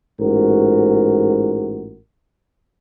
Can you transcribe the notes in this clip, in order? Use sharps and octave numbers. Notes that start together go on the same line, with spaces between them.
A1 G#2 F#4 A#4